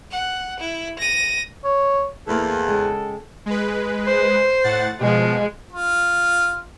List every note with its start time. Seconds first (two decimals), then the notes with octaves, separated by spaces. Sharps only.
0.11 F#5
0.59 E4
0.99 A#6 D#7
1.64 C#5
2.27 E2 A3 A#3 A4
2.68 C#3 G#3 G5
3.46 G#3 B4
4.05 C5
4.64 A2 F#5 A6
5.01 B2 F3 G#3
5.72 F4